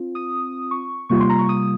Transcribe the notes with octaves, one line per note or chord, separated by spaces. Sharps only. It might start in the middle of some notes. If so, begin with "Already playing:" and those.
Already playing: C4 F4
D#6
C#6
C3 G3 A#3 F4 C#6
C6
A#5
C#6
D#6